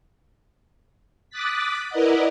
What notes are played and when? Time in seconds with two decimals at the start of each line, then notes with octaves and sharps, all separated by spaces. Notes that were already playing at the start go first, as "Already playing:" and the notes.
1.30 D6 D#6 F#6 A6 B6
1.89 E4 A#4 B4 D5 D#5 F#5